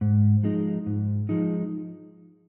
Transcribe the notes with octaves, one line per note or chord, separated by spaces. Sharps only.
G#2
F3 G#3 D#4
G#2
F3 G#3 D#4